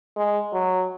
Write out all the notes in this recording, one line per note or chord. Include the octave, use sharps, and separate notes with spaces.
G#3
F#3